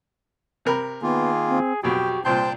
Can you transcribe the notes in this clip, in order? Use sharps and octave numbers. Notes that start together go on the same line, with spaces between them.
C3 A#4 B5
D#3 A#3 B3 F4 G#4
C4
B1 F2 F#4 G4 G5
C2 A#2 C4 C5 G5 A5 C6 G6